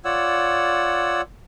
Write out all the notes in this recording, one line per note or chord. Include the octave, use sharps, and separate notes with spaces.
F4 C#5 D5 F#5 E6